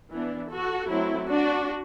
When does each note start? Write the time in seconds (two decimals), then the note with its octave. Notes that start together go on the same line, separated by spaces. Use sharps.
0.11 E3 B3 D4
0.50 F#4 A4
0.89 F#3 A3 C4 E4
1.27 D4 F#4